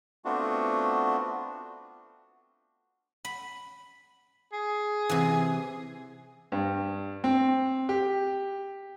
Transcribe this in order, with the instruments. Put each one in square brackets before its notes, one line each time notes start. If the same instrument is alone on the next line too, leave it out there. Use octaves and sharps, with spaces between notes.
[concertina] A3 B3 C4 D4 F4 F#4
[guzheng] B5
[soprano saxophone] G#4
[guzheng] C3 E3
[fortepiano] G2
C4
G4